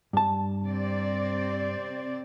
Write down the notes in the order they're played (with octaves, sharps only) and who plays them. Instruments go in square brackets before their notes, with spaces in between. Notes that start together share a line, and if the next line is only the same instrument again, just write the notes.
[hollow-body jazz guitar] G2 A5
[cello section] C3 C4 D5